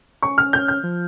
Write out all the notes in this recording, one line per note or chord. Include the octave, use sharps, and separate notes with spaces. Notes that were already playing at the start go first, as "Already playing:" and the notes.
C#4 C#6
F6
G6
G6
F3